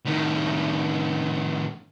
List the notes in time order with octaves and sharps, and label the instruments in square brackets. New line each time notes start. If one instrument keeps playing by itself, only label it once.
[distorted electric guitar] A2 D#3